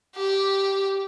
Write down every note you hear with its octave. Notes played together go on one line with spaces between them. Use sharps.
G4